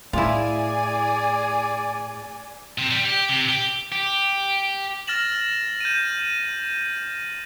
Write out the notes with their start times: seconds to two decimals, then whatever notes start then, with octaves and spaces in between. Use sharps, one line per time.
0.13 A2 E4 F4 G#4 D5 G#5
2.78 C3
2.91 G3
3.06 G4
3.29 C3
3.49 G4
3.92 G4
5.07 F6 A6 A#6 E7 F#7
5.81 G6 D#7